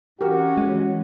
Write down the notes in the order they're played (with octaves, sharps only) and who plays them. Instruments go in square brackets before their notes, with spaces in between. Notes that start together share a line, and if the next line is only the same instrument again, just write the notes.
[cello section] E3 C#4 [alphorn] F#4 [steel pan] G4 A#4
[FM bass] G#3